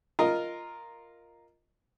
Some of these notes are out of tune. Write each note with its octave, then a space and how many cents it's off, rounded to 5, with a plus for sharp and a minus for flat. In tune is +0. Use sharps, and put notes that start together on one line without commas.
F4 +0 A#4 +0 D#5 +0